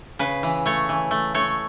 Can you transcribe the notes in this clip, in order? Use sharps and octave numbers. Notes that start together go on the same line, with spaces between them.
C#3 B4
E3
A3 C#5
E3
A3
A3 C#5